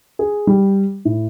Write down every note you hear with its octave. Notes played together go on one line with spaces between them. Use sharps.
G#4
G3
A2